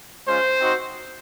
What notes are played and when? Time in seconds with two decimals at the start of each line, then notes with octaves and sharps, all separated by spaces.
0.27 G#3 C#4 F4 C5
0.60 C4 D#4 F#4